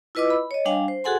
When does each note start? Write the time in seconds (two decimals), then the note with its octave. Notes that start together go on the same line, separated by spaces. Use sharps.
0.15 E4 F4 B4 D#5 D6 E6
0.30 B5
0.51 C#5 D#5
0.65 G3 D4 F5 G#5
0.88 C5
1.04 F#4 G#4 A4 F#5 G#5 C6